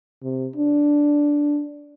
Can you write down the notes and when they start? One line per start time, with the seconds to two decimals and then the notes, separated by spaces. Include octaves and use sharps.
0.23 C3
0.56 D4